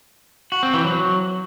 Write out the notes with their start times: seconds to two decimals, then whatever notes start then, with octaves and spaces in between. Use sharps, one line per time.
0.52 F#4
0.63 C4
0.74 E3
0.85 F#3